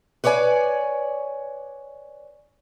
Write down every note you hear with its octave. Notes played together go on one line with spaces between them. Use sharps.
B4 C#5 D5 F5 G#5